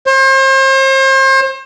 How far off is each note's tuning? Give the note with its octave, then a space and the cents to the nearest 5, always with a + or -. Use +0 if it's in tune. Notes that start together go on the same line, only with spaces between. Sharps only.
C5 +40